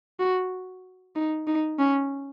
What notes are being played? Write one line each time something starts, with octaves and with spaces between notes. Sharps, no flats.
F#4
D#4
D#4
C#4